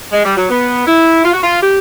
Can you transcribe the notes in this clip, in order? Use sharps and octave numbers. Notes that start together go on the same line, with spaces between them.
G#3
G3
F#3
B3
E4
F4
F#4
F4
G4